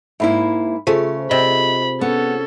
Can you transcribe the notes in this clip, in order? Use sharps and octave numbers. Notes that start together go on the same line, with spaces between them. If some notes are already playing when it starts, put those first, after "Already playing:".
G#2 A#3 E4 E5 B5
C#3 A3 F4 G#4 C5
C3 D#5 B5
B3 C#4 A4